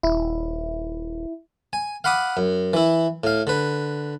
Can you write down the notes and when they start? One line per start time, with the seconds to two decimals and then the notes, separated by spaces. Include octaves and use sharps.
0.03 D#1 E4
1.73 G#5
2.04 F5 F#5 B5 D6 D#6
2.37 F#2
2.73 E3 E4
3.24 A2 F5
3.47 D3 B4